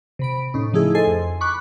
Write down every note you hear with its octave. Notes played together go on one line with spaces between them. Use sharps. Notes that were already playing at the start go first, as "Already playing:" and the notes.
C3 B5 D7
A2 C#4 D#4
C#3 F3 A3 D#4 E4 G#4
A4 C5 D#5 G#5 C6
F2
B5 C#6 D6 F#6